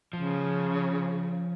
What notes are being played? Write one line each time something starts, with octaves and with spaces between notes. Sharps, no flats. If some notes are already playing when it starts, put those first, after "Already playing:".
C#3 F3